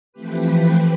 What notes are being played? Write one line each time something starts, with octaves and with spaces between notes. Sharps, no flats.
E3 F3 A3 C4 G4 B4